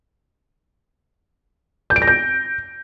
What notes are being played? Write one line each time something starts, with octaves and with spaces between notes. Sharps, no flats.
G6
D7
A#6
G6